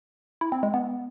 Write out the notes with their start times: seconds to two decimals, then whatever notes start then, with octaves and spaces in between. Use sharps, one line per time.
0.41 E4
0.52 C4
0.63 G#3
0.74 B3